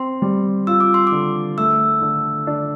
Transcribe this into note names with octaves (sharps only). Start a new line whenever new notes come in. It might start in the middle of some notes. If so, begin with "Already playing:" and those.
Already playing: C4 C6
G3
F4 E6
D6
C6
D3 D6
A3 E6
D3
D4